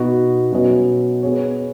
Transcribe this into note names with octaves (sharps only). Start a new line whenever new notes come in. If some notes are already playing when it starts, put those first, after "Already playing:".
Already playing: B2 B3 D#4 F#4
B2 F#3 C#4 B4 D#5
B3 G#4 C#5